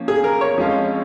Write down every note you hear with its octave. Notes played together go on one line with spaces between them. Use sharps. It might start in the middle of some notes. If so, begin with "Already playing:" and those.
Already playing: F3 A#3 C#4
G#4
A#4
C#5
F2 F3 G#3 C#4 F4